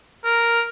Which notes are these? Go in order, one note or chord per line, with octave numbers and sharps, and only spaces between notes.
A#4